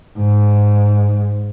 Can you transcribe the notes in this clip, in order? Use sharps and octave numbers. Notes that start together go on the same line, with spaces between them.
G#2